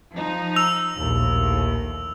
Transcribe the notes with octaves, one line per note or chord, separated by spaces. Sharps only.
F3 D#4
E6 F7
A#1 D#2 A2